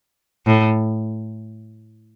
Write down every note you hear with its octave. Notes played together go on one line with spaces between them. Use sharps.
A2